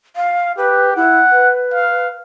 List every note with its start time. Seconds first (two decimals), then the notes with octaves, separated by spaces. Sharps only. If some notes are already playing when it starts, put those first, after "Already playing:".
0.16 F5
0.58 G4 B4
0.96 E4 F#5
1.32 B4
1.74 F5